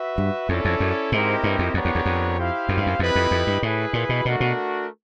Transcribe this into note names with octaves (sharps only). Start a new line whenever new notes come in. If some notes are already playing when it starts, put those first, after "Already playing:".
Already playing: F#4 B4 E5
G2
F2 C#4 E4 A4 D5
F2
F#2
G#2 C4 E4 G4 A#4 D#5
G2
F2
F2 B3 D4 G4 A#4 C#5
E2
E2
F2
E4 G4 C5 F5
F#2
G2
F#2
F2 E4 G4 B4 D#5
F2
F2
G2
A2 E4 G#4 B4
A#2
B2
B2 A3 D4 F#4 A#4
B2